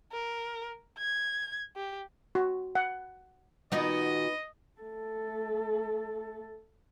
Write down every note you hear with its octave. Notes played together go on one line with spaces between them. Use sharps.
A#4
G#6
G4
F#4
F#5
A#2 D#3 B3 D#4 F#4 B4 D#5
A3 A4